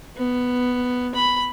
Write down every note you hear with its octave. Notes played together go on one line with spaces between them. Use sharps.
B3
B5